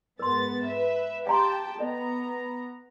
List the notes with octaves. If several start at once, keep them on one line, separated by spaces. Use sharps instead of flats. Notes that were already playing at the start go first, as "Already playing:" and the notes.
G#2 B3 A#4 C6 A6
B4 E5
G4 F5 G5 A5 A#5 C6
B3 A4 D#5 A#5